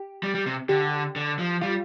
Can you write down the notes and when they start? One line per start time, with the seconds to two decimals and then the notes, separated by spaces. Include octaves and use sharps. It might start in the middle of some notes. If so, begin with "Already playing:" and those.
Already playing: G4
0.23 G3
0.35 G3
0.46 C3
0.69 D3 G4
1.16 D3
1.39 F3
1.61 G3 F4